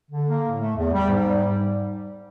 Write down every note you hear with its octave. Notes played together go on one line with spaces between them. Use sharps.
D3
A#3
A2
A3
E2
G3
G#2
G3